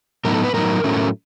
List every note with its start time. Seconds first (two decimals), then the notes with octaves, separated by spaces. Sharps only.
0.25 A2 F#3 B3 D#4 A#4
0.34 A4
0.44 B4
0.54 A2 F#3 B3 D#4 A#4
0.84 A2 F#3 A3 C#4